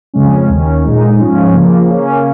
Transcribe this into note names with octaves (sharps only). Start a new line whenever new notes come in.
F2 C#3 G#3 C#4
D#2 D#3 C#4
A#2 G#3 D#4
G#2 F3 C#4
C#3 F3 A#3
C#3 A#3 C#4